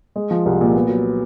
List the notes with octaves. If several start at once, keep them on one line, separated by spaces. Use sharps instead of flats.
G#3
F3
C2
A#2
B3
F#3